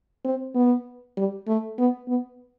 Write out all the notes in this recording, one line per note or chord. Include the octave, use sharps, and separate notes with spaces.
C4
B3
G3
A3
B3
B3